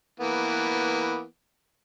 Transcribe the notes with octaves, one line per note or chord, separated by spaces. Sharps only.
E3 A#3 B3